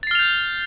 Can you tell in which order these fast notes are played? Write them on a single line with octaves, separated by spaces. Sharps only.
A6 C7 F6 F7 G6